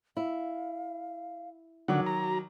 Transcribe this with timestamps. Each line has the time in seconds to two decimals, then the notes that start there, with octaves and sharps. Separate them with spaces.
0.17 E4 F5
1.88 D3 D#3 F#3 F#5 D6
2.06 F#4 A#5